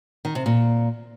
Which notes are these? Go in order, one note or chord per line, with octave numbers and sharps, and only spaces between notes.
D#3
C3
A#2